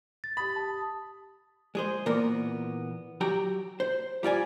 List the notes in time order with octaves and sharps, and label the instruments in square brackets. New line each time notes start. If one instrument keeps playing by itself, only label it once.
[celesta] A6
[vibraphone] G4 D#6 [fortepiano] B5
[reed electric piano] A5
[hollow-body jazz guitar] G#3 G#4 C5
A#2 E3 A#3 B3 A#4
F#3 G4 G5 A#5
C5
G3 F4 D5 G#5